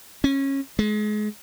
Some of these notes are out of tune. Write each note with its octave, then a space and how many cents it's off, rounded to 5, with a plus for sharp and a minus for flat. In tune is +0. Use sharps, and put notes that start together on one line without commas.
C#4 -20
G#3 +30